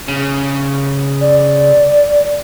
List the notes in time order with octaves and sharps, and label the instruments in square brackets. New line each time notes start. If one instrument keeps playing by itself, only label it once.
[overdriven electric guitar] C#3
[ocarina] D5